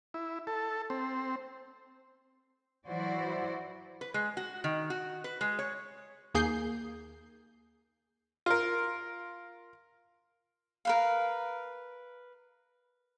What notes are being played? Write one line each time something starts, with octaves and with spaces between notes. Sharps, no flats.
E4
A4
C4
E3 F#3 E4 F#4 C5 D5
B4
G#3
F#4
D#3
F#4
B4
G#3
C#5
D#2 A#3 G#4 G6 C7
F4 A#4
A#4 B4 F5